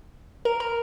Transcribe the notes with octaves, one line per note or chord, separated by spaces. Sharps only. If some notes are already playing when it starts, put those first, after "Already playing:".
A#4
A#4